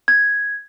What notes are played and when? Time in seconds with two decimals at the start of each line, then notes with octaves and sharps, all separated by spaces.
0.08 G#6